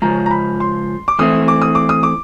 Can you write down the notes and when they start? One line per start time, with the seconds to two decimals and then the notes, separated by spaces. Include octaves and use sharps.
0.02 C#3 F3 G#3 A#5
0.26 A#5
0.31 B5
0.60 C6
1.08 D6
1.19 E3 A3 C4 E4 D#6
1.48 D6
1.62 D#6
1.75 D6
1.89 D#6
2.03 D6